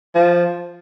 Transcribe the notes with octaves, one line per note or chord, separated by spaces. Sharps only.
F3